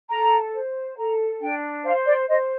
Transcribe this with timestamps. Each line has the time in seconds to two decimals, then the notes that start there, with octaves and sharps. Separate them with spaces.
0.10 A4 A#5
0.53 C5
0.98 A4 A#5
1.41 D4 G5
1.85 C5 F5
2.06 D5
2.29 C5 D#5